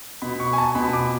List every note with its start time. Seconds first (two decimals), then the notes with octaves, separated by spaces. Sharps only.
0.22 B2 B5
0.40 C#6
0.53 G#5
0.58 A5
0.75 B2 B5
0.93 D6